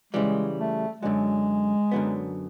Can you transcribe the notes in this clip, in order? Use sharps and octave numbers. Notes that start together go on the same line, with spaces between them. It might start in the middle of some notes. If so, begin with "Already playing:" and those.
C#3 E3 G3 G#3
A3
F#2 D3 F#3 G#3
F#2 D3 F#3 B3